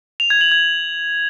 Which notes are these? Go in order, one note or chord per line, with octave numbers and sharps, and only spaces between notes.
F7
G#6
F#7
G#6